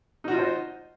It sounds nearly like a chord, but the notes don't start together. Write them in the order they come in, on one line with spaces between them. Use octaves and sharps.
D#4 F#4 F4 D#5 C5